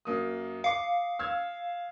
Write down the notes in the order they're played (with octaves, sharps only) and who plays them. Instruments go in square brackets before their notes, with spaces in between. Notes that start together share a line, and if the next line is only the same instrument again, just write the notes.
[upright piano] F#2 A#3 D#6
[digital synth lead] F5 [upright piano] D6 C#7
[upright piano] E6 F6 G#6